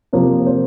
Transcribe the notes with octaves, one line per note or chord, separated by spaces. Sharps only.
C3 F3 A#3
C5